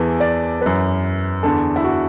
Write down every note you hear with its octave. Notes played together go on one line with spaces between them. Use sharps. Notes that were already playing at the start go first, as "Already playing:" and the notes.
Already playing: E2 E3 A4
D5
F#2 E3 B4
E2 D3 A4
E4
F#4